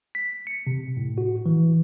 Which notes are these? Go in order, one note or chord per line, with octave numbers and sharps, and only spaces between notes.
B6
C#7
C3
A2
F#4
E3